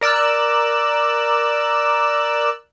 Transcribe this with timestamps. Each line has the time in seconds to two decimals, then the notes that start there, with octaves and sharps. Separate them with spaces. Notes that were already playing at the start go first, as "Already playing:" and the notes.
0.01 A#4 D5 E6 F#6